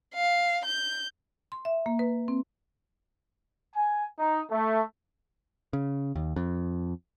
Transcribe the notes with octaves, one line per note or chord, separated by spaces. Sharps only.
F5
G6
C6
E5
A#3
B4
C4
G#5
D#4
A3
C#3
D#2
F2